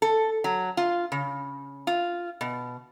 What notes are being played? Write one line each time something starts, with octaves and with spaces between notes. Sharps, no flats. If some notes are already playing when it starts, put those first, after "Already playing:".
A4
F#3
F4
C#3
F4
B2